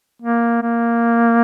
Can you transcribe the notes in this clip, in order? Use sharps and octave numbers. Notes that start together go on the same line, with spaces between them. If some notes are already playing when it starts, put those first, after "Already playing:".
A#3
A#3